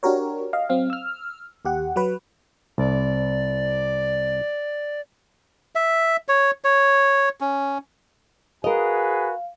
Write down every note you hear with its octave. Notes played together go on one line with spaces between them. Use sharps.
D4 F#4 G4 A#4 C#5
D#5 F5
F#3 C4 F5
E6 F6
D#2 G4 F#5
F#3 F#4 B4
C2 D5
E5
C#5
C#5
C#4
F#4 G#4 A#4 B4 D#5 F5 G#5